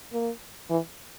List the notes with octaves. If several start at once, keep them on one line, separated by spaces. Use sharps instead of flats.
A#3
E3